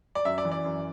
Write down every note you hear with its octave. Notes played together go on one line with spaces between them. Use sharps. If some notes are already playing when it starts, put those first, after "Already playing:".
D5
F#2 E5
D5
E3
D5
F#2